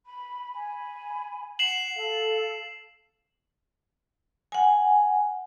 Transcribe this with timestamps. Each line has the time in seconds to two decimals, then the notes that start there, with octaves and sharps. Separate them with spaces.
0.06 B5
0.55 G#5 B5
1.59 F#5 C7 E7 F#7
1.96 A4 F5
4.52 F#5 G#5